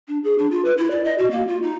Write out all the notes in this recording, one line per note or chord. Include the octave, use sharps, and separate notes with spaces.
D4
G#4
D4
F4
B4
E4
D5
D#5
F#4
A#3
F4
D#4